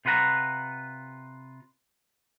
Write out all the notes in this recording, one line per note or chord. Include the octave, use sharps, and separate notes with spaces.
C3 F4 B4 F#5 A#5